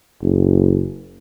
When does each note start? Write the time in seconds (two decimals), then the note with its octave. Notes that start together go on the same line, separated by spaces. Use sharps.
0.22 F#1